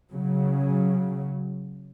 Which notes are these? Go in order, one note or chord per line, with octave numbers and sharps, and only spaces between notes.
C#3 F#3